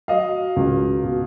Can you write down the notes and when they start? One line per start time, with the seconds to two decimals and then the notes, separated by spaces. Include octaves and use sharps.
0.08 F#3 D#5 F5
0.56 C#2
1.04 B2